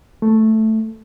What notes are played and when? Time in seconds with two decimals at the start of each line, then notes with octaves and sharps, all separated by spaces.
0.22 A3